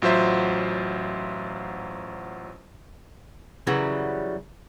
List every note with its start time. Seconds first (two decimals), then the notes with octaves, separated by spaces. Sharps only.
0.02 A1 F#3 F4 C5 E5
3.67 F#2 C#3 E3 F#3 G3